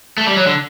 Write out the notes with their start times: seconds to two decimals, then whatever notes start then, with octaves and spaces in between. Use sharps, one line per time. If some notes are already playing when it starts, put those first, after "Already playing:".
0.18 A3
0.27 G3
0.37 F#3
0.46 D3